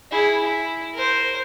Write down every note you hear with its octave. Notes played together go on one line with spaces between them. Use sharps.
E4 G#4
E4
A#4 C5